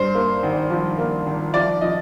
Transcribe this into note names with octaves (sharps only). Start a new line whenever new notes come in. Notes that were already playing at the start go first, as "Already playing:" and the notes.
Already playing: G2 C5
A#3
G#1
F3
A#3
G#1
F3 D5
F3 D#5